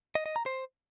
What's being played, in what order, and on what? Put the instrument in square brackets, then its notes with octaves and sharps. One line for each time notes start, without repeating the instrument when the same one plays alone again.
[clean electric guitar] D#5
D#5
A#5
C5